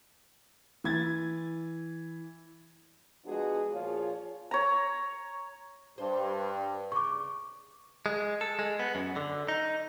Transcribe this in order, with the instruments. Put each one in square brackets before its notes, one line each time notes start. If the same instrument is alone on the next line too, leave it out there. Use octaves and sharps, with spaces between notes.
[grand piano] E3 G#6 A6
[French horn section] F3 G#3 B3 D4 F#4 G#4
A#2 F3 F4 G#4 C#5
[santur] C#5 A#5
[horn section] G2 [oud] C5
[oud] C#3 [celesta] C#6 D6
[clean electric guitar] G#3
A4
G#3
B3
F#2
D3
D#4